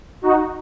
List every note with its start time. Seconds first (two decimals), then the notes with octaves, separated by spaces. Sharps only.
0.22 D#4 F#4